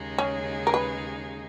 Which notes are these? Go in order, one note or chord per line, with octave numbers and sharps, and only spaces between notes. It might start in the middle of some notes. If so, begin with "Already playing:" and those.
Already playing: D#2 C#3 G#3 D#4 G#4
C#4
A#4
B4